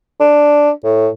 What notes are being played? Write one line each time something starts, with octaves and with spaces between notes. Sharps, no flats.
D4
A2